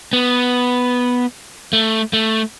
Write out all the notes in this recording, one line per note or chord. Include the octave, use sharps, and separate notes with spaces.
B3
A3
A3